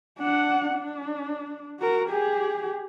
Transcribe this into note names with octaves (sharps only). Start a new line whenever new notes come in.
D4 F#5
D4
F#4 A#4
G4 G#4